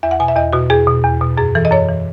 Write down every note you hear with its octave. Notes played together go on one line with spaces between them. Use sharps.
E2 E5
F#5
B2 G#5
E5
E2 D#5
B2 F#4
E2 G#4
B2
E2
B2
F#2 G#4
E3 A4
D#5
F#2 C#5
E3